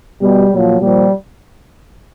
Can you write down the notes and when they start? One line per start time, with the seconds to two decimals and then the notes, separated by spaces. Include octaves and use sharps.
0.22 B2 G3
0.52 A#2 F3 F#3
0.81 A#2 F3 G3